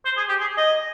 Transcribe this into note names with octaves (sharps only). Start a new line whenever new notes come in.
C5
G#4
G4
G#4
D#5